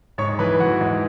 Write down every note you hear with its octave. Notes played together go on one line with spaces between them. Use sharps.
G#2 C#5 C#6
E3 B4 B5
E3 F#4 F#5
G#2